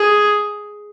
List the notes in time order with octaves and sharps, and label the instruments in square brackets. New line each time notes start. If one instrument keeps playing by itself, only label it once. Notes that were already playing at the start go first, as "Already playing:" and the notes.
Already playing: [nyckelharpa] G#4